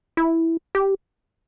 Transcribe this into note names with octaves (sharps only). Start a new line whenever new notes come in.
E4
G4